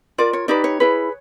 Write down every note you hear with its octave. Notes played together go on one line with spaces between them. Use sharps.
F4 A#4 D5
C#5
D#4 G4 B4 D5
C#5
E4 G#4 B4